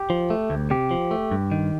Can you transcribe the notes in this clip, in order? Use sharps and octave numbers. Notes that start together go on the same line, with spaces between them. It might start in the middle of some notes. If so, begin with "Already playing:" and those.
Already playing: G4
F3
A3
D2
C3 G4
F3
A3
G2
D#3